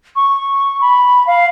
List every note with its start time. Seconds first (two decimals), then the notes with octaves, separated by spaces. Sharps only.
0.16 C#6
0.81 B5
1.27 F5